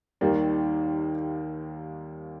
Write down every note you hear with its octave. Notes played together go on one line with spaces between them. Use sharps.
D#2 D#3 G3 A#3